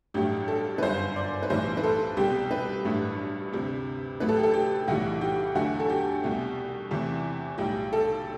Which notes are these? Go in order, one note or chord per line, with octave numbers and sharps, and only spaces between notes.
A1 G2 F#3 A3 G4
A4
B4
G1 F#2 F#3 C5
D5
B4
B1 A2 E3 G3 C5
B4
A4
C2 B2 G3 G4
B4
A1 G2 F#3 A3
D2 C3 G3
A1 A2 F#3 A3 B4
A4
G4
A4
G4
B1 A2 E3 G3 F#4
G4
E2 D3 F#3 A3 F#4
A4
G4
C2 B2 A3
E2 C3 E3 A3
B1 A2 G3 G4
A4